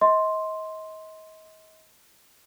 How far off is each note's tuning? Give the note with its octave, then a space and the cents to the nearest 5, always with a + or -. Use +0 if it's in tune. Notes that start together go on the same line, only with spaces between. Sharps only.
D#5 +35 C6 +0